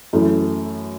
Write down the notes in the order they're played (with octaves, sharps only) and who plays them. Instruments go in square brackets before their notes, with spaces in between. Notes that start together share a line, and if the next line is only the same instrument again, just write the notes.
[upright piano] F#2 E3 A3 E4